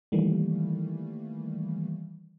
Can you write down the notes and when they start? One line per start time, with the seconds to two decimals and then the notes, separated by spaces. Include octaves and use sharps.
0.12 D#3 E3 G3 A3 A#3